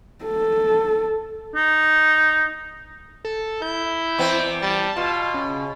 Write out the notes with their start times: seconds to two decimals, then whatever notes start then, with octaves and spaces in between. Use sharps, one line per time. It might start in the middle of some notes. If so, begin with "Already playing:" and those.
0.25 A4
1.55 D#4
3.25 A4
3.62 E4 G6
4.18 E2 B3 C4
4.62 G3 A5
4.97 B2 F4
5.34 C#3